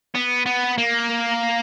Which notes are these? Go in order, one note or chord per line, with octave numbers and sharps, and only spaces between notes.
B3
B3
A#3